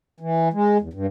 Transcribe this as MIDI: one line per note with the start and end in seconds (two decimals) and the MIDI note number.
0.20 0.49 52
0.53 0.77 56
0.81 0.89 40
0.93 1.06 43